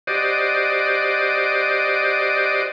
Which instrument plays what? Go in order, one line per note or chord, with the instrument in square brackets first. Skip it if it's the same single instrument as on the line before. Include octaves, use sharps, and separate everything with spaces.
[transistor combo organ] F#4 G4 C5 D5 D#5